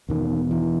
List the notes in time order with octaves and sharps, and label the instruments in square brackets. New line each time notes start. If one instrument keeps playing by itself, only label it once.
[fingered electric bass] E2 B2 D#3
E3